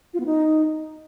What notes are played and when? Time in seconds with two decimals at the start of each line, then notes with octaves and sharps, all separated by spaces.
0.14 F4
0.20 B3
0.26 D#4